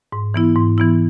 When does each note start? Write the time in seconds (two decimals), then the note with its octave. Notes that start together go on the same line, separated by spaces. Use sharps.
0.12 G#2
0.34 E3 B3 E4
0.56 G#2
0.78 E3 B3 E4